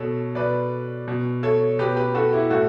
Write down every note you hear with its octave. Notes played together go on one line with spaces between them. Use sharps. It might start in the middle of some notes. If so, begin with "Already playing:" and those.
Already playing: B2 A4 C#5
B2 B4 D5
B2
A4 C#5
B2 G4 B4
G4 B4
F#4 A4
E4 G4
A2 F#4 A4